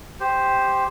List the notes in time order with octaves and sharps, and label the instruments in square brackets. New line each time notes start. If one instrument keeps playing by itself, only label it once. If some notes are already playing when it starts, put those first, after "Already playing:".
[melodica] G4 C5